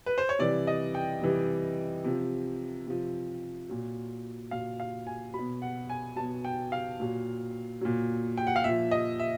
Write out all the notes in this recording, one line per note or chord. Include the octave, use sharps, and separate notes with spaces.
B4
C5
C#5
C3 E3 G3 D5
D#5
G5
C3 E3 G3
C3 F3
C3 F3
A#2 F#3
A#2 F#3 F5
F5
G#5
B2 F#3 B5
F#5
G#5
B2 F#3 A5
G5
F5
A#2 F#3
A#2 F#3
G5
F#5
F5
A#2 F3 E5
D#5
E5